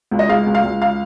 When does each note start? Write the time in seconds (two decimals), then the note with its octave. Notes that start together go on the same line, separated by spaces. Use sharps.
0.11 C#2
0.19 D#5
0.29 G#3 F5
0.46 C#2
0.55 F5
0.64 C#2
0.82 F5